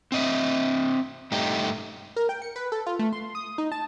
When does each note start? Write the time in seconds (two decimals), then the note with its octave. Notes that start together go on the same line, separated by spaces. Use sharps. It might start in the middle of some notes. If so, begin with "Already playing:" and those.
0.12 C4 D#5 E5
1.32 G2 A3 D#4 G4
2.16 A#4
2.29 G5
2.42 C#7
2.56 B4
2.72 A4
2.87 F4
2.99 A3
3.13 C6
3.35 D#6
3.58 D#4
3.72 A5